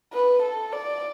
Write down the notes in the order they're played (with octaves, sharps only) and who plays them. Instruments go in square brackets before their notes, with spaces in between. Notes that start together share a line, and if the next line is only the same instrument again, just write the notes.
[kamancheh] B4
A4
D5